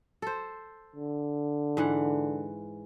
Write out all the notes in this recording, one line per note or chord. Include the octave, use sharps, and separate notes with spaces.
A4 C5
D3
G#2 E3 F#5